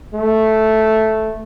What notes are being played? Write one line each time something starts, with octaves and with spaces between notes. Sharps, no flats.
A3